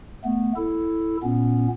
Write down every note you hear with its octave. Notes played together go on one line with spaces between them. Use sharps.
A3 B3
E4 A4
A#2 B3 C#4